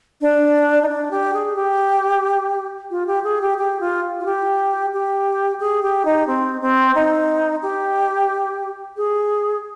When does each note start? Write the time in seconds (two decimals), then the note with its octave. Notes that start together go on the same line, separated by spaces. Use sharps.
0.21 D4
0.82 D#4
0.89 D4
1.11 G4
1.34 G#4
1.56 G4
2.91 F4
3.07 G4
3.24 G#4
3.42 G4
3.58 G4
3.80 F4
4.20 F4
4.26 G4
4.93 G4
5.60 G#4
5.83 G4
6.05 D#4
6.27 C4
6.61 C4
6.95 D#4
7.62 G4
8.97 G#4